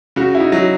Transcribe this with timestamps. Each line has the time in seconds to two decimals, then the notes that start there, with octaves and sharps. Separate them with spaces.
0.16 C#3 F#4
0.35 E4
0.40 D#4
0.52 F#3